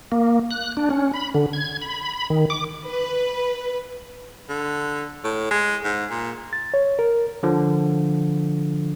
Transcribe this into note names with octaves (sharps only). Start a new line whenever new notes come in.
A#3
F#6
D4
C#4
B5
D3
G#6
B5
B5
D#3
D6
B4
D3
A2
G#3
G#2
A#2
A6
C#5
A#4
D3 F3